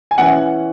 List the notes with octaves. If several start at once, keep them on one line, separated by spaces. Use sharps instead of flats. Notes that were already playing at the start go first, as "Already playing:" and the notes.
G#5
E3 C#4 E4 F#5